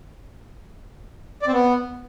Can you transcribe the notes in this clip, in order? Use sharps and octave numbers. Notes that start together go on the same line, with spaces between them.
D5
C4
B3